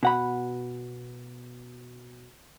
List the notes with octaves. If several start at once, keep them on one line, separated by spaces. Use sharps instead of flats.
B2 F#5 B5